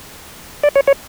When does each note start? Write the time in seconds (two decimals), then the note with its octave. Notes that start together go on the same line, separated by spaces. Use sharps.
0.64 D5
0.76 C#5
0.87 C#5